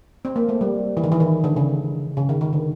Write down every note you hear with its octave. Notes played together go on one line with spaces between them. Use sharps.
C4
A#3
A3
G3
E3
D#3
E3
D#3
D3
C#3
C#3
D#3
D#3
D3